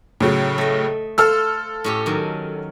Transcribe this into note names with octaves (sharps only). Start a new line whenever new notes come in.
A2 C#3 F#3
A3 D#5
A4 C5 F5 E6 F6
A2 C#4 G4
D#3 F#3